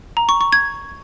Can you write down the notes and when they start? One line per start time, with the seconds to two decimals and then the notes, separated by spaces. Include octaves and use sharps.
0.17 A#5
0.29 C#6
0.41 C#6
0.53 G#6